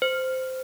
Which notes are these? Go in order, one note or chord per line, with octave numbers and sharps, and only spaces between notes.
C5